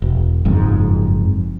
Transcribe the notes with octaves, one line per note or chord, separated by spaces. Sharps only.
E1
F#1 F2 G#2